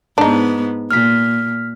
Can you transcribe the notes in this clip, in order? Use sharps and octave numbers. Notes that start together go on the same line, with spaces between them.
G#2 B3 D4 D#4
A#2 F6 B6